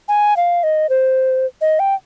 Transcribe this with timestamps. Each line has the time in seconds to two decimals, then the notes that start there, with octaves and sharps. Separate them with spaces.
0.08 G#5
0.37 F5
0.63 D#5
0.89 C5
1.61 D#5
1.79 G5